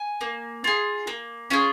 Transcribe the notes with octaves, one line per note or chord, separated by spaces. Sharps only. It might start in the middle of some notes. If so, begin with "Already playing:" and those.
Already playing: G#5
A#3
F4 G#4
A#3
C#4 F4 G#4